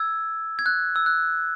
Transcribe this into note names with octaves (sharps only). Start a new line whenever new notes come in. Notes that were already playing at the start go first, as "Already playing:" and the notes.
Already playing: E6 G#6
G#6
F#6
E6
F#6